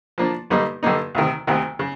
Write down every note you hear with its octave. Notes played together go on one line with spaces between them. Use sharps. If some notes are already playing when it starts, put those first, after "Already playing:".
F3 A#3 D4
G2 D3 G3 A#3 D#4
G2 D3 G3 A#3 D#4
D2 C3 D#3
D2 C3 D#3
C#3